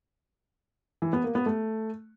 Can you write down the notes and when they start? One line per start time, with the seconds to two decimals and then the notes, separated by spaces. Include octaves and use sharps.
1.02 E3
1.13 B3
1.24 A#3
1.35 B3
1.46 A3